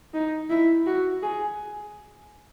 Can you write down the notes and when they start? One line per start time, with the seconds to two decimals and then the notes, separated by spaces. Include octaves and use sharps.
0.14 D#4
0.50 E4
0.87 F#4
1.23 G#4